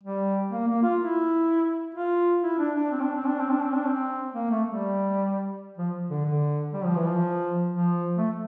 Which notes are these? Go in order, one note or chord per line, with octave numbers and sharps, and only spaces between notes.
G3
A#3
A#3
F4
E4
F4
E4
D4
D4
C4
D4
C4
D4
C4
D4
C4
D4
C4
A#3
A3
G3
F3
D3
D3
G3
F3
E3
F3
F3
A3